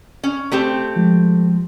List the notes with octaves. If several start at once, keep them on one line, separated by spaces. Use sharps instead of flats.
C#4
A3 C4 G4
F3 G#3